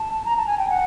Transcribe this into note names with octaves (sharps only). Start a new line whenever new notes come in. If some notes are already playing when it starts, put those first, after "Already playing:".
Already playing: A5
A#5
A5
G#5
G5
F#5